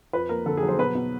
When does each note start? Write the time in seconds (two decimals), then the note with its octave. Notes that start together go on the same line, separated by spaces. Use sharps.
0.13 F2 B4
0.29 A#3 A#4
0.46 D3 A4
0.57 G#4
0.63 F#3
0.68 C5
0.78 B2 B4
0.95 B2